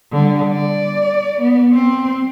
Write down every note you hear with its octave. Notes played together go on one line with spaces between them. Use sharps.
D3 G3
D5
B3
C4